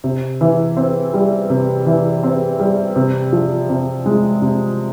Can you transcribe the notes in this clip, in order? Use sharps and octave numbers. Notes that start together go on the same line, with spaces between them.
C3
E3
C4
G3
C3
E3
C4
G3
C3
F3
C3
G#3
C3